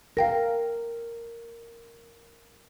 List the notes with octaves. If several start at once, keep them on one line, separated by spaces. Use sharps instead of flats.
A#4 F5 G5 A#6